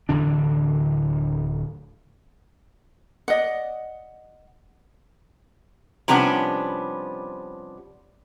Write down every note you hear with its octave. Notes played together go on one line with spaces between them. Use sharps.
D1 D3 E3 D4
D5 D#5 F#5
C3 F3 G3 B3 C#4 D4